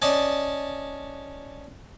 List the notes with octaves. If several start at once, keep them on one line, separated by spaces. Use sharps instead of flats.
C#4 D5 D#5 A5